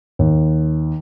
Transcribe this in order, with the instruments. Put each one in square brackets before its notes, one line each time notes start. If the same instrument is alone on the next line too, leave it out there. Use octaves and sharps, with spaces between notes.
[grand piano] D#2